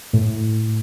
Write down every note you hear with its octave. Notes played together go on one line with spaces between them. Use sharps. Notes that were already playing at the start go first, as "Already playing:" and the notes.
A2